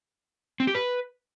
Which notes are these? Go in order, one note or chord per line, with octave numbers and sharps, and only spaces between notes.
C4
G4
B4